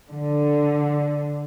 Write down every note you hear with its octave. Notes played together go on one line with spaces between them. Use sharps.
D3